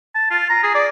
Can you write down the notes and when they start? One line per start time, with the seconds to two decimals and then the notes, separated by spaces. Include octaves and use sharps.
0.15 A5
0.31 F4
0.50 A#5
0.64 G#4
0.75 D5